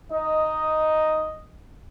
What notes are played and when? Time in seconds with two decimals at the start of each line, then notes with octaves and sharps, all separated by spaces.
0.12 D#4 D#5